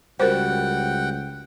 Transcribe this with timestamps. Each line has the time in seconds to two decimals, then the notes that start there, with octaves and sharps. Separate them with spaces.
0.20 C#2 G3 F#4 A#4 C5 F#5 G5